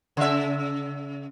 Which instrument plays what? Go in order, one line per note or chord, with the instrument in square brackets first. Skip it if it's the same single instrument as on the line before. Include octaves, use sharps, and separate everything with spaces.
[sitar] C#3 E5